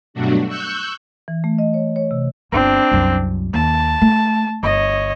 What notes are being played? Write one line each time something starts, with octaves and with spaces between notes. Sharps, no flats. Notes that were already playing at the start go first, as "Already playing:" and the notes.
G2 B2 F#3 A3 D4 F#4
C#6 E6 F#6 G6
E3
A3
D#5
C#5
C#5
C3
G1 C4 D4 F4
C2 F#2
D#2 A5
A3
G1 C#5 D#5